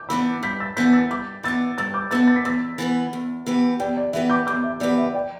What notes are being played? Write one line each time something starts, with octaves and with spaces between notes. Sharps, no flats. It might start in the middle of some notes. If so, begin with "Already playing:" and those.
Already playing: D6 G6
E3 B3 D4 B5 E6
G2 G6 B6
E6 A6
E3 B3 D4 G6 B6
E6 A6
G2 D6 G6
E3 B3 D4 E6 A6
G2 E6 A6
D6 G6
E3 B3 D4 E6 A6
A6
B6
E2 E6 A6
E3 B3 G4 B4
E2
E3 B3 G4 B4
E2 D5 G5
D5
E3 B3 G4 B4 E5
D6 G6
E2 D6 G6
E5
E3 B3 G4 B4 D5
E5
D5 G5